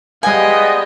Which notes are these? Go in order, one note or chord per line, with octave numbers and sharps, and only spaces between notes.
G3 G#3 B3 D#5 F5 G5 G#5